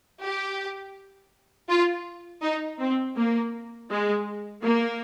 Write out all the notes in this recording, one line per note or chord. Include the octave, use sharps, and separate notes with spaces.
G4
F4
D#4
C4
A#3
G#3
A#3